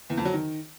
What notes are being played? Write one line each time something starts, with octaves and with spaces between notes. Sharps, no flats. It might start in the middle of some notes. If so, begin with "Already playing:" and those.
E2
F2
F#3
D#3